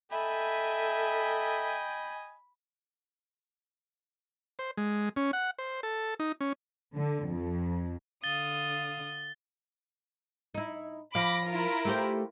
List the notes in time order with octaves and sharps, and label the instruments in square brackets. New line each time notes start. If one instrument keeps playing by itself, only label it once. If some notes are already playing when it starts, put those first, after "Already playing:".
[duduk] A4 [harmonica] D#5 G5 G#5 [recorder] E5 [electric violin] B5
[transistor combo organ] C5
G#3
C#4
F#5
C5
A4
D#4
C#4
[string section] D3
F2
[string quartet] D3 F5 D#6 [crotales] A6 G7
[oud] D#4 E4
[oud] F3 F5 [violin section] B5 D6 A#6
[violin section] E4 F4 A#4
[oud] A3 G4 C5